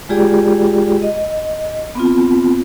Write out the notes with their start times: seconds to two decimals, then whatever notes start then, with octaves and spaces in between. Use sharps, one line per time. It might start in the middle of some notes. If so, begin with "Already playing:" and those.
0.09 G#3 F4 G4 G#4 D5 G5
1.02 D#5
1.95 B3 C4 F4